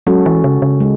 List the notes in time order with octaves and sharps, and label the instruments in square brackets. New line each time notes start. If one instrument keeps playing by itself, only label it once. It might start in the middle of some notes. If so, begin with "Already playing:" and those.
[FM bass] F#3 [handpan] G#3 C#4 F#4 A4
[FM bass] E3
C#3
C#3
[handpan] G#3